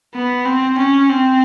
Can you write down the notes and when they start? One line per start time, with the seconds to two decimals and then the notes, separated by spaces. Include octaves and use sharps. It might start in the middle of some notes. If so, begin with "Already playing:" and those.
0.14 B3
0.45 C4
0.77 C#4
1.09 C4